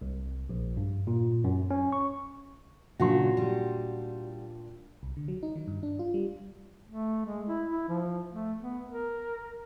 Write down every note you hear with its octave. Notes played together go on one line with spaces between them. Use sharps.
C2
A#1
G2
A#2
F#2
C#4
C#6
A#2 C#3 F#3 D4 F#4 C6
G3
C2
D3
F#3
D#4
D#3
G2
D4
F4
G3
A3
G#3
E4
E4
F3
A3
B3
A#4